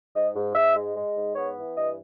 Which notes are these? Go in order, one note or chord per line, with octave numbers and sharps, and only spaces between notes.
G#2 D#5
G#2
G#2 E5
G#3
G#3
G#2
B3 C#5
E3
G2 D#5